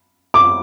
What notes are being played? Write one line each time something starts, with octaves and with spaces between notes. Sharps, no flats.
D6